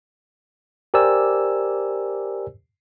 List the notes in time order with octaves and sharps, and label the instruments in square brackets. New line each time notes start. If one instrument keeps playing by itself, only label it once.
[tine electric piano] G4 A#4 C5 D5 G#5 E6